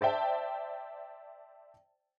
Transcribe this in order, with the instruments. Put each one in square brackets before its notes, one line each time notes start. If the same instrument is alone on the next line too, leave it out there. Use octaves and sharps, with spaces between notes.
[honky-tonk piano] C5 D5 E5 G5 A5